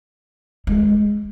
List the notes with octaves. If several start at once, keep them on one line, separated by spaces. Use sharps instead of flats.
G#3